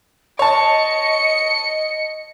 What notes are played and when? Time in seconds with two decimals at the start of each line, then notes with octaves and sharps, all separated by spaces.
0.39 C#5 D#5 A5 C#7